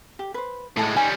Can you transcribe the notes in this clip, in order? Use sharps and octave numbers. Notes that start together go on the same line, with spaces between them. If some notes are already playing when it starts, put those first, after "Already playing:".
G4
B4 C5
A2 G#3 A4 A5
G3 C#4 D#4 G#5